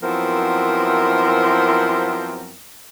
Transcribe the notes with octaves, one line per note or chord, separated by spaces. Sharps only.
F#2 F3 B3 C4 E4 A#4